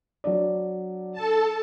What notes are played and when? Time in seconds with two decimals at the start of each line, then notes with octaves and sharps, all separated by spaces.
0.24 F#3 D4 D5
1.13 A4 A5